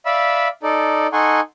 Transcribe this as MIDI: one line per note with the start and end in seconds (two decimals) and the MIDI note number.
0.06 0.48 74
0.06 0.48 76
0.06 0.48 77
0.06 0.48 83
0.06 0.48 88
0.63 1.07 63
0.63 1.07 69
0.63 1.07 74
1.13 1.40 63
1.13 1.40 69
1.13 1.40 78
1.13 1.40 80
1.13 1.40 84
1.13 1.40 85